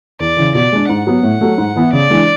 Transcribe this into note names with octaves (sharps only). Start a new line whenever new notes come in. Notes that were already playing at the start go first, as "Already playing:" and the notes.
E2 D5
C#3 E3
B2 D5
G#3 D4
G#2 F#5
F#3 B3
A2
F#3 A3
G#2
E3 B3 E4
C#3 D5
E3 G#3 D4